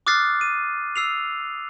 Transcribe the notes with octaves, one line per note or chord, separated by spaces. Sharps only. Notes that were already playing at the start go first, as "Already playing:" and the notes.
D6 D#6 F6 F#6 A6 C7
D#7
E6 C7 F7